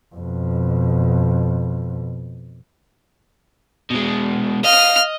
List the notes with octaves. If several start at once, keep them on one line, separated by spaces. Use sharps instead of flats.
F2 B2
B2 G#3
D#5 F5 F6